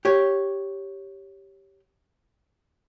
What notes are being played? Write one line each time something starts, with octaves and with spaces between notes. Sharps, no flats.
G4 C#5